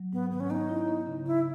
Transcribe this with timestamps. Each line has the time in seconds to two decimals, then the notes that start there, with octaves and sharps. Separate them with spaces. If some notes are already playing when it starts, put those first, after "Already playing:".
Already playing: F#3
0.13 G#2 B3
0.31 D#3 B3
0.40 C#4
0.50 B3 D#4
0.69 E4
0.88 B3
1.07 C#3
1.26 C#3 E4